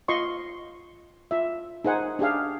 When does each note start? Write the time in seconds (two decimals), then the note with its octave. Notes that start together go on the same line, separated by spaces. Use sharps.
0.08 F4 D#5 C6 C#6
1.31 F4 E5
1.85 D#4 G#4 C5 F#5 G#5
2.19 D4 G4 G#4 F5